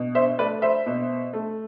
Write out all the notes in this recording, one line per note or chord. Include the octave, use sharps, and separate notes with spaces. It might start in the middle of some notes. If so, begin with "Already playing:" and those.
Already playing: B2
C5 E5
A3 B4 D5
C5 E5
B2
A3